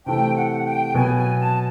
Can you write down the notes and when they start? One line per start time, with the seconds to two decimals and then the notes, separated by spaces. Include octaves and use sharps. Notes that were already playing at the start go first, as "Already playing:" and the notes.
0.05 C3 E3 A3 G5
0.35 F#5
0.65 G5
0.94 B2 F#3 B3 G#5
1.17 G#5
1.39 A5